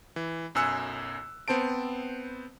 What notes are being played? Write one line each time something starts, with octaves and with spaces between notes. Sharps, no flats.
E3
B1 F#2 G#5 E6 F#6 C#7
B3 C4 C5 A5 D7